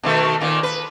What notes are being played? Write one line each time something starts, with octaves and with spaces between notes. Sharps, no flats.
B2 D#3 A3
A#2 D#3
B4